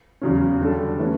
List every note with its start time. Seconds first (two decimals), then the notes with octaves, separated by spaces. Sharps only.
0.21 E2 C#3 F#3 C#4
0.61 D3 G3 D4 A4
0.99 E3 A3 C#4 F#4